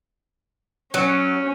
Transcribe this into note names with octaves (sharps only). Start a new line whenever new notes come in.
F#3 C#4